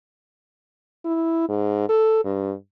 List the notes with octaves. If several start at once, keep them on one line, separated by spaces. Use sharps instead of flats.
E4
G#2
A4
G2